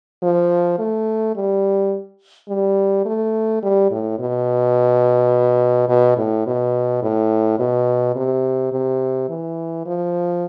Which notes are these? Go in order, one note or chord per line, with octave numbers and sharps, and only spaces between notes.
F3
A3
G3
G3
A3
G3
A2
B2
B2
A2
B2
A2
B2
C3
C3
E3
F3